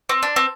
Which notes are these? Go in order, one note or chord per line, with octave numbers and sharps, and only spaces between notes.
C4
D4
C4